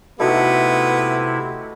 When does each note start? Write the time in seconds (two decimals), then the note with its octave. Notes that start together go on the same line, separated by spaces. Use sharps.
0.20 C3 A3 B3 D#4 E4 F#4